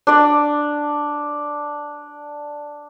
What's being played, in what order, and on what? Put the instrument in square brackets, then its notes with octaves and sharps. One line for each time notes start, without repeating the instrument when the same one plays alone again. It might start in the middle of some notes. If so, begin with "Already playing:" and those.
[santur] D4 D5